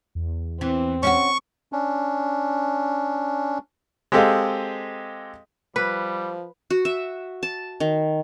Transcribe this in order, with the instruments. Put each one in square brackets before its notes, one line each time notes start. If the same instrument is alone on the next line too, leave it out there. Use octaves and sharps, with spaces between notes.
[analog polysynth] E2
[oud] E3 [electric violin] C4
[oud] C#4 E4 F#4 [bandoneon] C#6
[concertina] C#4 D4
[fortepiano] G#3 C4 G4 A4 D#5 F5
[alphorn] F3 [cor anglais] G3 [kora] B4
[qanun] F#4
E5
A5
D#3